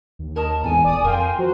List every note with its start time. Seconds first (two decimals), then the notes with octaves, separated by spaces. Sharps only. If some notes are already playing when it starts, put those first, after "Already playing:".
0.19 D#2
0.36 A#4 C#5 D#5 A5
0.64 E2 G#2 A4 G#5
0.84 D#1 D5 D6 D#6
1.04 F2 A#4 F5 G5 C6
1.38 F3 F#4 C5